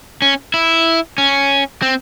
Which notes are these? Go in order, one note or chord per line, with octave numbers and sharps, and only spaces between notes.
C#4
E4
C#4
C4